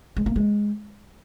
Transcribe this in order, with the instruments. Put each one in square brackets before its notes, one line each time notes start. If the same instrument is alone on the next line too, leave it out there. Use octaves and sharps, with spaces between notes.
[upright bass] G#3
A#3
G#3